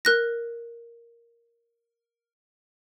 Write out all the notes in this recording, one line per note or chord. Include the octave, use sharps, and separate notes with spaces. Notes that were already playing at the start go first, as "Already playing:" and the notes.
A#4 F#6 A#6